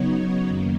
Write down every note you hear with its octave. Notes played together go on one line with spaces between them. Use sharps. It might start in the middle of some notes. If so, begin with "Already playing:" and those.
Already playing: C#3 F#3 B3 D#4 C#5
F#2 D#3 A#3